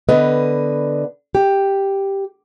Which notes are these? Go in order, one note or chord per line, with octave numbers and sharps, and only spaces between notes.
D3 B3 B4 D#5
G4